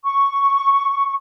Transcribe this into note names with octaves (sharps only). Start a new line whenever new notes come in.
C#6